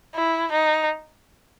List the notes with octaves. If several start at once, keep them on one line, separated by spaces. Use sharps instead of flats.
E4
D#4